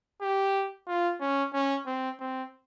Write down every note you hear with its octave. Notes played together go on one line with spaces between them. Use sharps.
G4
F4
C#4
C#4
C4
C4